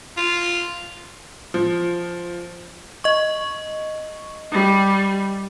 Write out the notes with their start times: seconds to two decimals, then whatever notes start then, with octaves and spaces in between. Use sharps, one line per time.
0.17 F4
1.54 F3
3.04 D#5 C#6
4.52 G3